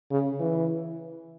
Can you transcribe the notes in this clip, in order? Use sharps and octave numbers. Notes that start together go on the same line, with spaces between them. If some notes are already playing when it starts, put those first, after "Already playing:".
C#3
E3